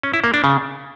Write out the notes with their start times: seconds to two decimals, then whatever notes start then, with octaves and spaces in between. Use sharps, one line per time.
0.03 C#4
0.14 E4
0.24 A#3
0.34 D4
0.44 C#3